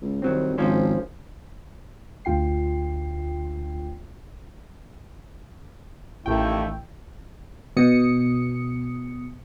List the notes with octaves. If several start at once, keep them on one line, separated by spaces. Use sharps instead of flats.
C#2
C2 D#3 F#3 C4
G#1 F3 C#4 C5
D2 F4 G5 C7
A1 D#2 A3 E4 G5
B2 D#6 C#7